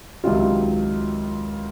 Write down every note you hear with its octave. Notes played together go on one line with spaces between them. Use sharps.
C#2 C3 D#3 F#3 F4